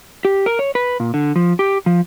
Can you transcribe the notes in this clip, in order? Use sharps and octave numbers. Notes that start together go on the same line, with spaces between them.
G4
A#4
C#5
B4
A#2
D3
F3
G4
F3